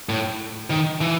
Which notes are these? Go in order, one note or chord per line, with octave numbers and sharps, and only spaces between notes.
A2
D#3
E3